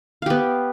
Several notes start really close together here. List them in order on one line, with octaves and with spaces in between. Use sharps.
F5 G4 B3